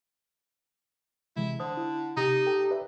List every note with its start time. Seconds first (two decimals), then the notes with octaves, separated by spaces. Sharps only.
1.36 C3 E3 G#3 E4
1.60 D3 C5 D#6
1.77 E4
2.17 C3 D#4 G4
2.46 A4 G5
2.71 B4 D5 E5